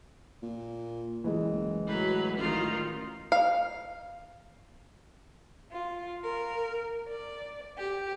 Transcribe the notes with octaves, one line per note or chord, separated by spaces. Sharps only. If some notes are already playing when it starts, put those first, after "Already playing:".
A#2
F#1 E3 G#3 G#4
A2 F#3 B4
A1 D#3 F4
F5
F4
A#4
D5
G4